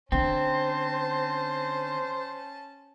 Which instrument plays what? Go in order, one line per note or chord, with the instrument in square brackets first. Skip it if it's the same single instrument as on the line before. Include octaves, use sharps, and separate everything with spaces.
[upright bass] D3 [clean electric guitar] C4 [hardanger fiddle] C#4 A5 [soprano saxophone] C5